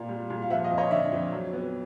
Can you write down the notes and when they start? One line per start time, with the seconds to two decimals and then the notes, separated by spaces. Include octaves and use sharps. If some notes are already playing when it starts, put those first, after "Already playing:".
Already playing: A#2 A#3 D5
0.09 G3
0.30 A#2
0.42 F5
0.50 F3 E5 F#5
0.64 D#5 F5
0.71 F2
0.78 C#5 D#5
0.91 D3 D5 E5
1.12 F2
1.32 F#3
1.53 B3